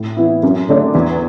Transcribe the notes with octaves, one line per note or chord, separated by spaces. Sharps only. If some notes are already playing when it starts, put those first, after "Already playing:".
Already playing: A2
E3 B3 E4
F#2
D3 A3 D4
E2